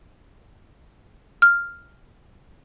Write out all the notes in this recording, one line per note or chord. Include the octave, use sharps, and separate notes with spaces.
F6